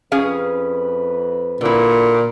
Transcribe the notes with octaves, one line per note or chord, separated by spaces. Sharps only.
F2 C#4 G#4 B4 F5
A#2 D3 E4